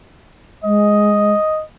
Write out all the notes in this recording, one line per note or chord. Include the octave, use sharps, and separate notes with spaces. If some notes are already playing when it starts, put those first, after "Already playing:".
G#3 D#5